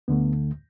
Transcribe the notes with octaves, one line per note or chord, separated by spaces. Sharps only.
D2 D3 A3 B3